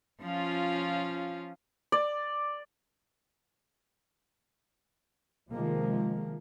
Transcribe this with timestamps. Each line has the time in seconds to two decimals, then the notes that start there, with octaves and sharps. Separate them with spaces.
0.22 F3 C#4 F4
1.92 D5
5.51 C3 D#3 F3 G#3 A#3